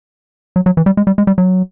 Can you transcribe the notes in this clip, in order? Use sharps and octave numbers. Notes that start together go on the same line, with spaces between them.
F#3
F#3
E3
G3
G#3
G3
G#3
G3
F#3